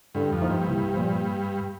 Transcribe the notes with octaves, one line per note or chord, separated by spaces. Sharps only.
G2 D3
F2
F3 A#3 D#4
G2
C2
A#2 F3